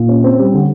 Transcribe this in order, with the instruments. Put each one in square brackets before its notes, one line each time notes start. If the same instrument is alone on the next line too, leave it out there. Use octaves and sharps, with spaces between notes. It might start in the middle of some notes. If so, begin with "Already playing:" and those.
Already playing: [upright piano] A#2
C#4
C4
G3
D3